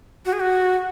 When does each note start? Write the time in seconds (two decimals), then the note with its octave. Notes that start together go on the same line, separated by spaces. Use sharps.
0.26 F#4
0.33 G#4
0.40 F#4